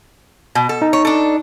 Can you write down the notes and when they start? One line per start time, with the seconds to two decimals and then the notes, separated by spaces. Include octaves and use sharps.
0.55 B2
0.69 A4
0.82 D#4
0.93 C#5
1.05 D4 A4